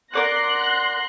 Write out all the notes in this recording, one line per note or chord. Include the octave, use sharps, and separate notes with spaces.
A#4 D5 F#5 C6 F#6 A#6